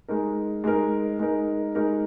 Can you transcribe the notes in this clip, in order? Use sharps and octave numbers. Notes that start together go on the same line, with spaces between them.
G#3 D#4 A#4
G#3 D#4 A#4
G#3 D#4 A#4
G#3 D#4 A#4